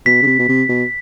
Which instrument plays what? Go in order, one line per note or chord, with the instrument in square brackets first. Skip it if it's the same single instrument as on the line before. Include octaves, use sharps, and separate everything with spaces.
[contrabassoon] B2 [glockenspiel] B6
[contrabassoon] C#3
C3
B2
C3
B2